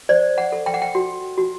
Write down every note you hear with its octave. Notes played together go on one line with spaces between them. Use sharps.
C5 D5
F#5
A4
G5
F#5
G5
F#4
F#4